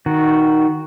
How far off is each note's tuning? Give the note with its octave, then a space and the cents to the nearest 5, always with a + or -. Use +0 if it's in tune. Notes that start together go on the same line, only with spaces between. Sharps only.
D#3 +0 F#4 +0